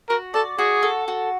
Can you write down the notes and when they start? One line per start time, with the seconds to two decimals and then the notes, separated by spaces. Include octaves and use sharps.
0.09 F#4 A#4
0.34 A4 D5
0.58 F#4 G#4
0.83 A4
1.08 F#4